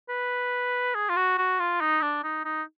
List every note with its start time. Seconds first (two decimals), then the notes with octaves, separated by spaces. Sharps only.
0.09 B4
0.95 G#4
1.09 F4
1.17 F#4
1.38 F#4
1.59 F4
1.81 D#4
2.02 D4
2.24 D#4
2.45 D#4